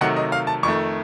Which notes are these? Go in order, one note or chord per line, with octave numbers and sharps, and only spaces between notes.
C3 D#3 F#3 A3 F#5
D#5
F5
A5
F2 D#3 A3 C#6